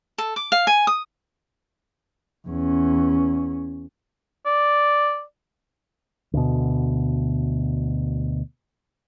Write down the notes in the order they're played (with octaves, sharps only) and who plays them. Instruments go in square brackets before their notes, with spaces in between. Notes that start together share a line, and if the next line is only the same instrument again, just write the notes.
[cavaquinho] A4
D6
F5
G#5
D#6
[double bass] E2 C#4
[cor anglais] D5
[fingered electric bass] D2 B2